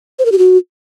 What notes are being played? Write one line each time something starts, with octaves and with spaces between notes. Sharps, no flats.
C5
A#4
G4
F#4